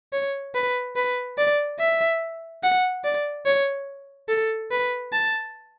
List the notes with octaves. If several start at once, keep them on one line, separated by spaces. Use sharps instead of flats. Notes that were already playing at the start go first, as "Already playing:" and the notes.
C#5
B4
B4
D5
E5
F#5
D5
C#5
A4
B4
A5